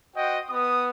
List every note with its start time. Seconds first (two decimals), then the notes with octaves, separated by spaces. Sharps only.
0.15 F#4 C5 D#5 F#5 G5
0.49 B3 B4 D#6